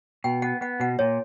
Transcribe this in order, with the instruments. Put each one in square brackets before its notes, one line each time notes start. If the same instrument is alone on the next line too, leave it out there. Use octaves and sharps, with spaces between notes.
[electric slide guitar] B2 [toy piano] G5
[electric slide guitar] B3 [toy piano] F#5
[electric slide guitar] B3 [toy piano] F#5
[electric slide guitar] B2 [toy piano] F#5
[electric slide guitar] A#2 [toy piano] C#5